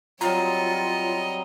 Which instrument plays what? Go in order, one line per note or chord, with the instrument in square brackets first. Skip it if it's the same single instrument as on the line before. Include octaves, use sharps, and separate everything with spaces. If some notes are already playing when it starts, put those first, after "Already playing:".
[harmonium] F#3 G3 C4 [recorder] F4 [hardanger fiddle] C#5 D#5 [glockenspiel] A#5